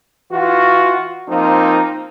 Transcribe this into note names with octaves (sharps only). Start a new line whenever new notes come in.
E3 F4 F#4
F3 A#3 C4 D#4